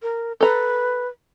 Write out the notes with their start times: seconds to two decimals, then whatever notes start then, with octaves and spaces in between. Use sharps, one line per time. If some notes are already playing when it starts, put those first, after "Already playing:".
0.02 A#4
0.41 A4 B4 A#5